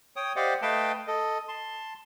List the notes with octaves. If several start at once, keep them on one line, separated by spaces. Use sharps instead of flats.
C#5 G5 D#6
G4 C5 D5 D#5 F5 F#5
A3 B4 D#5 F5 G5 A5
A4 D#5
A5 C6